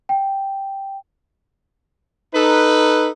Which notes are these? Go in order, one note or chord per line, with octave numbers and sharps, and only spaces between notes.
G5
D#4 A4 B4